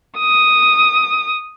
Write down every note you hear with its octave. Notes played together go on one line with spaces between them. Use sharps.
D#6